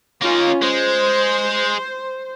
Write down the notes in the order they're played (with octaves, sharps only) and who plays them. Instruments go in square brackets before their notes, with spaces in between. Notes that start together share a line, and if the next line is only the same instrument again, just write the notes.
[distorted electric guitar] A#3 D#4 [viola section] C#4 F4
[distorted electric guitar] G#3 [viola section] C5